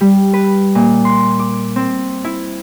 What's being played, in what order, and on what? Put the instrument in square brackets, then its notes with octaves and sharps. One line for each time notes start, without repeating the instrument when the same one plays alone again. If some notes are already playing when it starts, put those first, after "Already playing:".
[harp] G3
B4
A#2
C6
D6
C4
E4